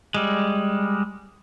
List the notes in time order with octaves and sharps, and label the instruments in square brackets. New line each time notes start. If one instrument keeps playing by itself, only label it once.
[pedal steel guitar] G3 G#3